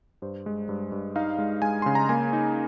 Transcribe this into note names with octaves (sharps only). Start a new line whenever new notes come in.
G2 C5
G#3
G2
G2
D#4 F5
G#3
G#3 G#5
C#3 C6
A#5
A#3 G#5
D#4